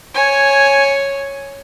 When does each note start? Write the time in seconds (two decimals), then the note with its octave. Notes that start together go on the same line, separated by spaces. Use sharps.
0.14 C#5 G#5